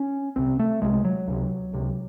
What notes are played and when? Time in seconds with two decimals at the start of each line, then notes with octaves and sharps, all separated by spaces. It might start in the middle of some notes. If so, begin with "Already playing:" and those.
Already playing: C#4
0.36 C2 C3 C4
0.59 A3
0.82 C2 C3 G#3
1.05 F#3
1.28 C#2 C3
1.73 C#2 C3